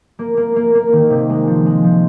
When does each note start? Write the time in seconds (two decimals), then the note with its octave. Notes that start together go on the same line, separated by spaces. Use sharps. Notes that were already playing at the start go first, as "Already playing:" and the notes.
0.19 A#3
0.37 A#3
0.56 A#3
0.75 A#3
0.93 D#3
1.10 C3
1.30 G#3
1.47 F3
1.66 G#3
1.84 F3